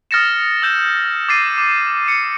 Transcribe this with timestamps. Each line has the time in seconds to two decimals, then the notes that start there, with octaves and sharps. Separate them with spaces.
0.11 D#6 F6 A6 A#6 C#7 E7
0.62 E6 G6 E7
1.29 D6 A6 C7 D#7
1.58 D6
2.08 C#7